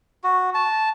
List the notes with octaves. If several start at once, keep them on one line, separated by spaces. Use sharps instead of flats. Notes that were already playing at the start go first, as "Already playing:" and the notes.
F#4
A5